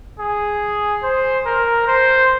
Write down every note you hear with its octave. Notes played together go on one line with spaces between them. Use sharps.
G#4
C5
A#4
C5